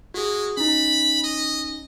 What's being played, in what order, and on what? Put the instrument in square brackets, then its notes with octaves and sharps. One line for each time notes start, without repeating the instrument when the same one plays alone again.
[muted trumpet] G#3 [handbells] F#4 G#4
[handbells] C#4 D#4 [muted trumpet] B5
[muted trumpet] D#5